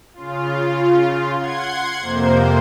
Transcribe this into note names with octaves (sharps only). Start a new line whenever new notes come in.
C#3 F4
F#5 C6 G#6
F2 C3 A#3 C5